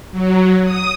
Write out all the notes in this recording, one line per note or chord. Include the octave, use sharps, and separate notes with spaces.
F#3
D#6